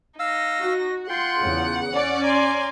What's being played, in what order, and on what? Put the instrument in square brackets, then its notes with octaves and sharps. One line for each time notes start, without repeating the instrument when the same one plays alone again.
[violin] D#4 A#6 [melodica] F5 E6
[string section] F#4
[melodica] F4 G5 [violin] F#5 [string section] C6
[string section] E2 C#3
C#4 D5
[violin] G#5 C6 [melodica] A#5